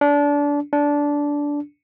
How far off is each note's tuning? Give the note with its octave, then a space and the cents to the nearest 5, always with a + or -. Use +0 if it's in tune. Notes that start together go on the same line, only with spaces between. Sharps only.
D4 -25
D4 -15